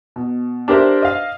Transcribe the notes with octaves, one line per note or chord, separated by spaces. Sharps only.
B2
D4 G4 A#4 C5 E5
D#5 F5